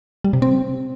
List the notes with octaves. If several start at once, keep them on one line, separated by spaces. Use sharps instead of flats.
G3
C3
C4